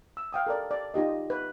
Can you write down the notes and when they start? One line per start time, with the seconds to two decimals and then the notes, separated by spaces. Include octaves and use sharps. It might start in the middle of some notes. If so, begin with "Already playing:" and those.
0.17 E6
0.33 F5 G5 D#6
0.47 A4 A#4 D5
0.71 D5
0.94 D#4 F4 G4 D#5
1.30 B4